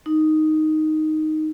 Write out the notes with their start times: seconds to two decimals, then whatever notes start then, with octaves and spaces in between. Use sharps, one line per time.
0.06 D#4